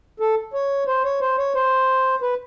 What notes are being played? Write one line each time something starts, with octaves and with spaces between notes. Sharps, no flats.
A4
C#5
C5
C#5
C5
C#5
C5
B4